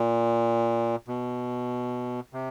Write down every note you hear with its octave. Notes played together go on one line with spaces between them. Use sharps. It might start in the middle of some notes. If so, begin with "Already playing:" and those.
Already playing: A#2
B2
C3